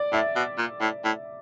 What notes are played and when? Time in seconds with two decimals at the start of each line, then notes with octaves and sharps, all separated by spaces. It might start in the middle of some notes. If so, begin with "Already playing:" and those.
Already playing: D5
0.12 A2 E5
0.36 B2
0.58 A#2
0.81 A2
1.04 A2